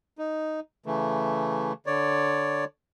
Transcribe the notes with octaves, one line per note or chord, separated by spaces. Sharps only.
D#4
C#3 E3 A3
D3 C#5 D5